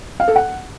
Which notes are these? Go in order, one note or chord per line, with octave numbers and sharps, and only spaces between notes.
F5
A4
F#5